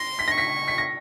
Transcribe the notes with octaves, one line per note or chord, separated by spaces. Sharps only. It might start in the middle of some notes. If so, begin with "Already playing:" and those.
Already playing: C6 A#6
B6
C#6 A#6
B6
B6
A#6